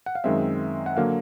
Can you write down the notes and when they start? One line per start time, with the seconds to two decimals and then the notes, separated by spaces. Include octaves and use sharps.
0.06 F#5
0.15 F5
0.24 F#2 D#3 G#3 C4 E5
0.86 F#5
0.97 D3 F#3 A#3 F5